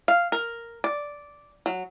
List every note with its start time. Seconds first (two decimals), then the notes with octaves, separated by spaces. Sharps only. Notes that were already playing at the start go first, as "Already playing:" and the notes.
0.08 F5
0.32 A#4
0.84 D5
1.66 F#3